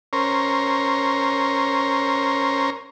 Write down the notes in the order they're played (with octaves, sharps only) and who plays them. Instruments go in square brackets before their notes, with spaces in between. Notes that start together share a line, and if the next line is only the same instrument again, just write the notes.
[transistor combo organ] C#4 A#4 C5